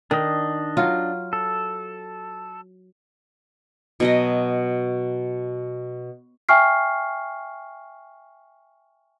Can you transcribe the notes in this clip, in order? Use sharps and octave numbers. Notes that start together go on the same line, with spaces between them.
D#3 D4 D#5
F#3 F4
A4
B2 F#3 D#5
E5 G5 G#5 C#6 F6 C7